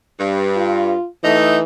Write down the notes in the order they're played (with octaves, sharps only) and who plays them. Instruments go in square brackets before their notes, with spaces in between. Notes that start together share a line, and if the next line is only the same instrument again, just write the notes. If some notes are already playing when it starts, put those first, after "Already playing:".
[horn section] G2
[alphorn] F4
[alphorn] E3 [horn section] A3 D#4